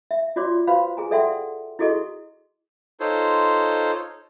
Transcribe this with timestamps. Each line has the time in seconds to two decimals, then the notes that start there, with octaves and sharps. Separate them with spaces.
0.11 E5
0.36 F4 F#4 C#5 D5 C6 D6
0.67 F#4 B4 C5 F5 B5
0.97 G#4 G#5 A#5
1.11 A4 D5 E5 F#5 G5 C6
1.79 E4 F#4 G#4 A4 D#5 C#6
3.00 D#4 F4 A4 C5 C#5